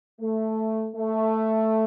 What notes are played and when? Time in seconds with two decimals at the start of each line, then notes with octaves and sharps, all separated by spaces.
0.21 A3
0.95 A3